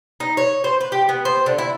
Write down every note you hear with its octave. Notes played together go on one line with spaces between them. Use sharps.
D#4
C#5
C5
B4
G4
B3
C5
D3
E4